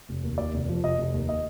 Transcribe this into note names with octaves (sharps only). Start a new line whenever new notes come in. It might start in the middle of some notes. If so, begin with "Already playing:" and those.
F1
D#2
D#2 D5
F1
F3
F1 D#5
F1
D#2
D#5